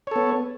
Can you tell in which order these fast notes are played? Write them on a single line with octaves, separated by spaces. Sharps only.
C#5 A4 B3